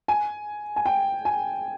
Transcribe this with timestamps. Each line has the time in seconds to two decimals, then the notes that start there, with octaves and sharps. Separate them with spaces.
0.08 G#5
0.76 G#5
0.86 G5
1.25 G#5